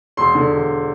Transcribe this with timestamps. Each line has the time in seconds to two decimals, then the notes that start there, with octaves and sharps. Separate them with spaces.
0.17 E1 C6
0.35 D3
0.52 E1